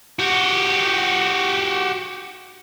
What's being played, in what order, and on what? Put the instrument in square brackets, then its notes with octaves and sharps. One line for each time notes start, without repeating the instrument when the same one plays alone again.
[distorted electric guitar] F#4 G4